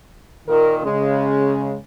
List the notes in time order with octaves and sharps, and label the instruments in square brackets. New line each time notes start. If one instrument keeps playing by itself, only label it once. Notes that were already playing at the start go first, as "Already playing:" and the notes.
[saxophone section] A#2 D#3 [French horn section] A#4
[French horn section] C#3 [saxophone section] G#3